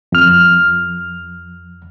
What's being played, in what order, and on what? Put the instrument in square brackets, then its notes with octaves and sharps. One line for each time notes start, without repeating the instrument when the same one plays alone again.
[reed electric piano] F2 F6